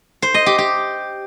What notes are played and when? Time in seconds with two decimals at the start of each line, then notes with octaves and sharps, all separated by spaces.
0.22 C5
0.34 D#5
0.46 G4
0.58 G4